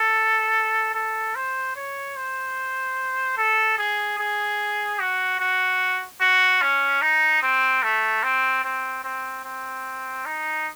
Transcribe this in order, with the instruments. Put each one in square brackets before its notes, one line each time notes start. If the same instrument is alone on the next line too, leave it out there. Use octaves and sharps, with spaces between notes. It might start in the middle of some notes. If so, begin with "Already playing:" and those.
Already playing: [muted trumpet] A4
A4
C5
C#5
C5
A4
G#4
G#4
F#4
F#4
F#4
C#4
D#4
C4
A3
C4
C4
C4
C4
D#4